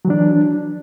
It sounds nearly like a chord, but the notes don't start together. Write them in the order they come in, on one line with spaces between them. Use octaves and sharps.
F#3 E3 D4